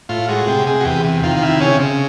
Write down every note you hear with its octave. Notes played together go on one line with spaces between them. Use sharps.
A2 F4
G#3 F#4
C3 G4
C3 G#4
F#4
E2 G4
C3
D#3 F4
F4
C3 E4
C#3 C#4
C#3